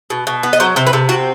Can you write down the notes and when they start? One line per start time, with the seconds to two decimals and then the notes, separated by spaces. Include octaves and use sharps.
0.10 B2
0.27 B2
0.43 B3
0.53 D#5
0.60 F#3 C5
0.76 C3 C5
0.87 B4
0.93 C3 A4
1.09 C4 F#4